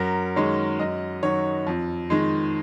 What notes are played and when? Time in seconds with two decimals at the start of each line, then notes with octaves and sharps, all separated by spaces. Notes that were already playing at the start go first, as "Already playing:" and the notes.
Already playing: F#2 A#4
0.36 D#3 G#3 C#5
0.79 F#2 D#5
1.23 D#3 F#3 C#5
1.66 F2
2.10 D#3 G#3